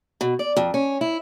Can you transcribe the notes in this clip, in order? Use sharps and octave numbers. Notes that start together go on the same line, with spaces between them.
B2
D5
F2
C#4
E4